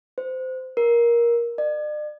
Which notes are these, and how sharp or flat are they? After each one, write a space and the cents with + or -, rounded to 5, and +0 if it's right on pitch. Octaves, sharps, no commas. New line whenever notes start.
C5 -20
A#4 +15
D5 +40